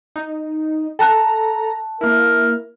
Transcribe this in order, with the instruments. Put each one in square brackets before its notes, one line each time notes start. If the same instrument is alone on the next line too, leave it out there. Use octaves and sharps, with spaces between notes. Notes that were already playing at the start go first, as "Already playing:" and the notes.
[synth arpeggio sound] D#4
[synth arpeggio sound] A4 A#5 [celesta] G5 A5 F#6
[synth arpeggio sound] A#3 E4 [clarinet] A#4